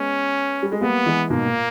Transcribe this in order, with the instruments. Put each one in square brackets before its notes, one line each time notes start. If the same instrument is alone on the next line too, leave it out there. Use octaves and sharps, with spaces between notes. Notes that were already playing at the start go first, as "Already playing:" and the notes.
Already playing: [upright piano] G#3 B3 [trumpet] C#4
[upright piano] G3
G#3
[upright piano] G3 A#3 [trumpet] B3
[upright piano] E3 G#3
[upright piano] G#2 B2 [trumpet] A#3
[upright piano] A#2